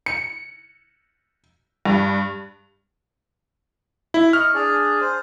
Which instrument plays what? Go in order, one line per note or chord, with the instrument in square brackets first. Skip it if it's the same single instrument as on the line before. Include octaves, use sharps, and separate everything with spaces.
[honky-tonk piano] C#7
G2
[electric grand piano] E4
[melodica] D#5 C#6 [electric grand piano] F6
[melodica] D4 G#4 D5
C5